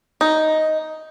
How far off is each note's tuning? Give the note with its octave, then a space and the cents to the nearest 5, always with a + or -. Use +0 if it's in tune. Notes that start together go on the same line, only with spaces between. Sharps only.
D#4 +5